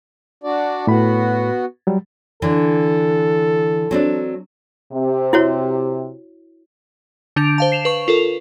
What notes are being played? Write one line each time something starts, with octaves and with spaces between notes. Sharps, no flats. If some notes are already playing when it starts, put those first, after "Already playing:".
D4 F#4 D5
A2 B3 F#4 B5
F#3 G3
D3 E3 A4
F#3 C4 D4
C3
E4 F#4 C#5
D3 D4 G6 D7 F7
C5 F5 A5
C7 E7 F7
B4 C#6
F4 A4 A#4